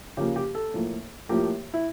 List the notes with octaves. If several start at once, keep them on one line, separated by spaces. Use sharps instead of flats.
C#3 F3 A#3 G4
G4
A4
A2 F3 A#3
A2 F3 A#3 G4
E4